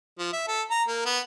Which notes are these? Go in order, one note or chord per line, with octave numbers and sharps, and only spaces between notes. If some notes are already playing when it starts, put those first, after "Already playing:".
F3
E5
A4
A#5
A#3
B3